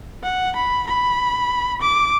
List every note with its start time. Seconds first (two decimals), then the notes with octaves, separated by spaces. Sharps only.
0.23 F#5
0.56 B5
0.87 B5
1.82 D6